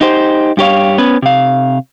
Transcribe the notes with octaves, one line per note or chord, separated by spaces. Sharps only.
D#4 G4 C5
G2 G4 C#5 F5
B3 C#4 B4
C3 F5